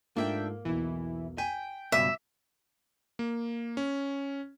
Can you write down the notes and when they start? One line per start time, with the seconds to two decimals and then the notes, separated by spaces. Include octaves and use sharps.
0.17 G#2 A3 A#3 D4 F4 E5 G5
0.65 B1 E2 E3 E4
1.38 G5 G#5 B6
1.92 C#2 G2 B2 E5 D6 B6 D#7
3.19 A#3
3.77 C#4